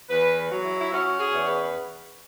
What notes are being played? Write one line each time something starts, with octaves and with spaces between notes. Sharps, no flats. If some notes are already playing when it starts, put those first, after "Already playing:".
E2 B4
F#3
E4
E4
C#4 F#4
G#4
E2
B4